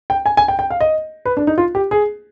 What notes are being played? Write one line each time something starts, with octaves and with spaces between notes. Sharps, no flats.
G5
G#5
G#5
G5
G5
F5
D#5
B4
D4
D#4
F4
G4
G#4